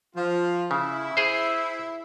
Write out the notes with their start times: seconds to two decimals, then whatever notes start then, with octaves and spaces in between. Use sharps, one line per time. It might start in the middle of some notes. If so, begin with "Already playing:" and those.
0.15 F3 F4
0.71 C#3 E4 E5
1.17 G#4 C5